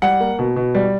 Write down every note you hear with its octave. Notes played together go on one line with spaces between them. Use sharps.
G3 F#5
A#3
B2
B2
G3